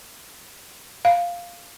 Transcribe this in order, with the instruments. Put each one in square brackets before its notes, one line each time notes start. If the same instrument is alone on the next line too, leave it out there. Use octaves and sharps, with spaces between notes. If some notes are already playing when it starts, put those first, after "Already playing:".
[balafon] F5